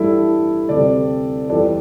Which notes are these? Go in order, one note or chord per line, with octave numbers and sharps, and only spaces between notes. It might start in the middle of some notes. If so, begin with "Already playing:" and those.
Already playing: A1 G2 G3 E4 A4
D2 C3 G3 A4 D5
E2 E3 G3 A4 D5